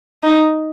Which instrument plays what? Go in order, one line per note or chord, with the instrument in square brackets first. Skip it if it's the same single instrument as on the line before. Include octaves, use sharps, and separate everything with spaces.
[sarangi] D#4